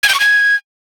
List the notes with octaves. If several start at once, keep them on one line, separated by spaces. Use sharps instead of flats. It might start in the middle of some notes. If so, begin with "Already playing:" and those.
G#6
G6
C#6
G#6